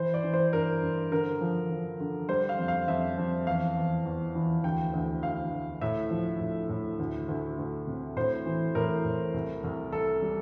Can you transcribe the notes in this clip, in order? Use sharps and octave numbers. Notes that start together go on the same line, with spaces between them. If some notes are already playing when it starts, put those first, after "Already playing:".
Already playing: E3 C5
D5
E3
C5
G2 A#4
G2
D3 A#4
F3
F3
D3
G3 C5
F5
F2
F5
F2 E5
F2
E2 F5
E2
E2
E3
D2 G5
D2
D2 F5
D2
A2 E5
F3
A2
A2
D2
D2
D2
C3
A2 C5
E3
A2 A#4
A2
C2
C2
C2 A4
G3